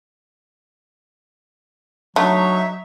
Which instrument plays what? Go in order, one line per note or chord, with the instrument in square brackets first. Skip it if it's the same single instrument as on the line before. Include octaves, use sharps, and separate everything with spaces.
[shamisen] D3 A3 [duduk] F#3 [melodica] D#4 C#5 [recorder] E5